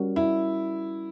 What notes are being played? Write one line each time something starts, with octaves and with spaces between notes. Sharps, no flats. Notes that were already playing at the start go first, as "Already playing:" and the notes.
Already playing: G3 C#4 F#4 A#4
E4